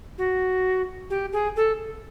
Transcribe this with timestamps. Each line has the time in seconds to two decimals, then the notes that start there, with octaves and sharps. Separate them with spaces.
0.18 F#4
1.10 G4
1.33 G#4
1.56 A4